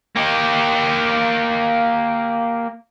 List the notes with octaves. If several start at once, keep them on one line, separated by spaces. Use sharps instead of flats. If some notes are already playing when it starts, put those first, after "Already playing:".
A#3 G4